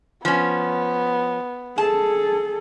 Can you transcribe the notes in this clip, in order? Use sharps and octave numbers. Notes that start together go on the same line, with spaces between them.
F3 B3 C#4
G#4 A4 A5